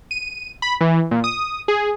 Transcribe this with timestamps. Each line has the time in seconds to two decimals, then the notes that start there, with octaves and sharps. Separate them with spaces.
0.11 D#7
0.62 B5
0.81 E3
1.11 A#2
1.24 D#6
1.68 G#4